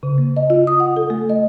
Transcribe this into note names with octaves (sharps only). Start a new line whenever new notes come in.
C#3
A#3
D#5
F4
D#6
F#5
A4
A3
D#5